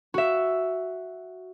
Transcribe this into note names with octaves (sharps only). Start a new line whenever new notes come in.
F#4 E5